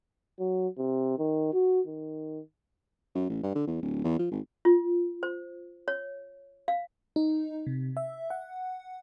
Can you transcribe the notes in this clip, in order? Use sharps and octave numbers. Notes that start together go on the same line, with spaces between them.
F#3
C3
D#3
F#4
D#3
F#2
A1
G2
D3
E2
D1
E2
F3
G#1
F4
C5
C#5
F5
D#4
C3
E5
F#5